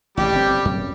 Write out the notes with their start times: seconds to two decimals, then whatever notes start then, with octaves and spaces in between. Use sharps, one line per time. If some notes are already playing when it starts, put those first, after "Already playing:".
0.17 A1 A2 C3 G3 G4
0.32 G1 C4
0.65 F#2